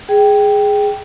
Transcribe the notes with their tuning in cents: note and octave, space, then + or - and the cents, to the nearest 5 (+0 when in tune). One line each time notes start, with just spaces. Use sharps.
G#4 +0 G5 +0